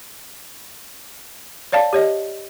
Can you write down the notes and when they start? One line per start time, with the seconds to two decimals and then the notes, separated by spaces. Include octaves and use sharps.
1.72 C#5 D5 F5 A5
1.93 G4 C#5 D#5